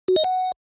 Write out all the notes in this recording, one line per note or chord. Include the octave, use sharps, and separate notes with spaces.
F#4
D#5
F#5